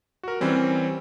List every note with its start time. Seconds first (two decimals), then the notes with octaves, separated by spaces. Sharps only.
0.23 F#4 A#4
0.41 E3 G3 C4 C#4